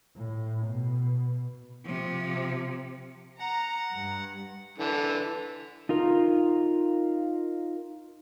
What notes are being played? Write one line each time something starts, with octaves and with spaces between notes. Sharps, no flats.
A2
B2
C3 F3
F#5 A#5
G2
D3 E3
D#4 F4 A#4